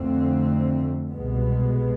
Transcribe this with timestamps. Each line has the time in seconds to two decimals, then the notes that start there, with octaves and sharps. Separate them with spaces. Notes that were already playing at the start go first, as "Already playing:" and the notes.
Already playing: F2 D3 A3 C4
1.09 C2 B2 G#3 B3